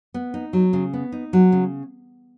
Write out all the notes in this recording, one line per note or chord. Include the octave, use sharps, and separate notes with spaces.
B3
D#4
F#3
C#3
B3
D#4
F#3
C#3